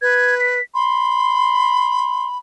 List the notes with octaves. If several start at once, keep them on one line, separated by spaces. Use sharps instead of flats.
B4 G#6
B6
B5 C6